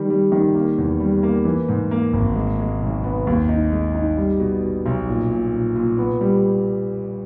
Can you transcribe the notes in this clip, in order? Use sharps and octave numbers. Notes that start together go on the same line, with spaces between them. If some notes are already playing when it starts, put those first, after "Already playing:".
Already playing: D#3 G3
G3
D#3
A#3
E2
G3
A#3
E3
G#2
A#3
G#1
G#3
G#3
B1
B3
D#2
D#4
G#3
D#4
G3
B2
B2
B1
A#2
A#2
A#2
A#2
B3
G3